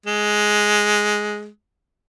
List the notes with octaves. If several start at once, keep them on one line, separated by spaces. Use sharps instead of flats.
G#3